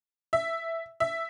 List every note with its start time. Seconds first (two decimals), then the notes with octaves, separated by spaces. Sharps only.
0.33 E5
1.00 E5